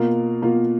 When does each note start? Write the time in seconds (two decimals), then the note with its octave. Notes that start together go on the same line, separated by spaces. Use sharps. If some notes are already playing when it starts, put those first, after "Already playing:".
Already playing: B2 A#3 F4 A#4
0.42 B2 A#3 F4 A#4